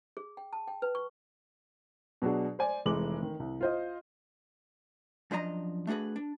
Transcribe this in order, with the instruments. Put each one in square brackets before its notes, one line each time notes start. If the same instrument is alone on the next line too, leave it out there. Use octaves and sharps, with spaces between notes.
[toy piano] G#4
G5
A5
G5
B4
C#6
[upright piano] B2 F#3 D4 F#4 G#4
C5 D5 G#5
F1 E3 G#3 D6 F#7
D#3
C2
F4 C5 D#5
[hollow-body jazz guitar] F#2 F3 D4 D#5 A#5
A3 D4 F#4 G#4 B4
D4